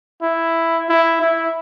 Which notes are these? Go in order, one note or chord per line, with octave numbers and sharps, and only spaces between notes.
E4
E4
E4